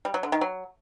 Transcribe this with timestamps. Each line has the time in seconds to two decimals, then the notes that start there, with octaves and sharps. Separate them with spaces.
0.05 G3
0.14 F#3
0.23 D3
0.32 D#3
0.41 F#3